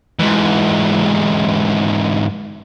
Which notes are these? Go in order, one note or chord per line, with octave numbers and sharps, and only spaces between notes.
G#2 E3